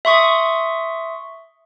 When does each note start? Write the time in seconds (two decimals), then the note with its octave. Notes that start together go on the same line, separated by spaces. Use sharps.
0.05 E5 C6 C#6 D#6